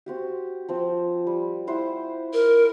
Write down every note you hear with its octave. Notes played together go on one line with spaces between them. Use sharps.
C4 F#4 G4
F3 C4 G5
G3
E4 C5 F#5
A#4